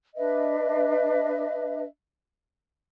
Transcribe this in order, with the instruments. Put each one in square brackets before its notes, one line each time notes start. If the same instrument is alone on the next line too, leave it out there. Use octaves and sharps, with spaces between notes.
[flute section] D4 B4 D#5 E5